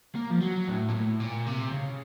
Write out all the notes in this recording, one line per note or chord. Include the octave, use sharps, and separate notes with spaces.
A#3
F3
F#3
A2
A#2
A2
A#2
C3
C#3